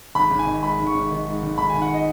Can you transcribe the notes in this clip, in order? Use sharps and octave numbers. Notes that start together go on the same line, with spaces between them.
G#1 B5
G#1
G#5
D#3
G#2 B5
G#1
C#6
G#1
D#3
G#2
G#1
G#1 B5
D#3 G#5
F#5
D#5